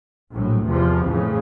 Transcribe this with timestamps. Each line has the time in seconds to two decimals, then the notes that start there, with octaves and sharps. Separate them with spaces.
0.33 A#1 A2 F#3
0.66 E2 C3 F3
1.07 F2 A2 C#3 E3